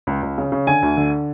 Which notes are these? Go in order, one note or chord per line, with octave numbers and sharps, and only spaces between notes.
C#2
C#2
C#3
C#3
D3 G#5
D2
D3